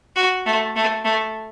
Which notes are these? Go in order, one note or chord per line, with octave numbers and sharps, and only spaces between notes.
F#4
A3
A3
A3